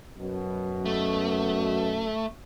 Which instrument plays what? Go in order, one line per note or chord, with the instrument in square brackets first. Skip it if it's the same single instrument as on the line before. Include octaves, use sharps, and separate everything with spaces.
[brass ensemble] F#2 B2
[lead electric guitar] A3